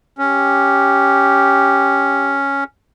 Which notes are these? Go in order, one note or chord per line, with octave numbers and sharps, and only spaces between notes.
C#4 G4